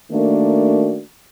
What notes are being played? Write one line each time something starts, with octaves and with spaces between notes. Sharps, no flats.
D#3 A3 A#3 D4 F#4 A#4